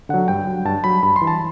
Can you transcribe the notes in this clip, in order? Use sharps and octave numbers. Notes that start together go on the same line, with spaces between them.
D3 F#3 F#5
G2 G5
F#3
G2 A5
F#3 B5
G2 B5
C6
E3
A5